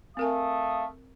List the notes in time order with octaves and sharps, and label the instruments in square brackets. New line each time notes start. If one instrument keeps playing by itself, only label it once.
[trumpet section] A3 F5 D#6 [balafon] C4 A#4 G#5